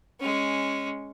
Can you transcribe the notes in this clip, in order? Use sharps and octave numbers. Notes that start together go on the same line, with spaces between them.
G#3 C#4